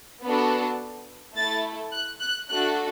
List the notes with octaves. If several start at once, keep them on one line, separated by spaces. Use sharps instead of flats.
B3 D4 F#4 A4
A3 E4 A4 A6
F#6
F#6
A3 D4 F#4 A4 F#6